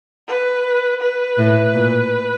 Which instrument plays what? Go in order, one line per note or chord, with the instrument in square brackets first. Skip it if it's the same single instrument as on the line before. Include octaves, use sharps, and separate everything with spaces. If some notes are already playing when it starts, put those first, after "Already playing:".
[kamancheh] B4
B4
[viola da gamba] A2
A#2